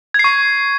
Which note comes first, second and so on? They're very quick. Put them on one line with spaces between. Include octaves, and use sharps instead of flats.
G#6 C7 C#6